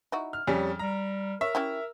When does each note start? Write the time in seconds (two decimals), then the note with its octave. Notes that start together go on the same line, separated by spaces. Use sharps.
0.12 D#4 E4 F#4
0.33 F6
0.47 F2 G3 C#4 G#4
0.79 G3 A#5
1.41 A#4 C#5 E5
1.55 C#4 E4 G4